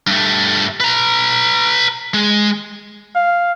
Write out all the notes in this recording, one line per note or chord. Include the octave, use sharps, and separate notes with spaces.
G2 A3
B4 A#5
G#3
F5